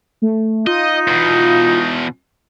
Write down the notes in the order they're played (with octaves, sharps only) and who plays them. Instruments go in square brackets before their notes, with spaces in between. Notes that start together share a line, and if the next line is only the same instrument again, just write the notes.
[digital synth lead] A3
[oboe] D#4 [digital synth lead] F4 [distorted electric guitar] D#5
[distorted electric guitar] E2 B2